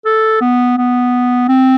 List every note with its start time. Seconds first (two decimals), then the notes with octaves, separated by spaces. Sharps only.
0.05 A4
0.41 B3
0.78 B3
1.49 C4